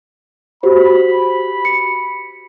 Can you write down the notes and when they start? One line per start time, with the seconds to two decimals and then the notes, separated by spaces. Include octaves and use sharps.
0.63 F#4 G4 C5 B5
1.65 C#7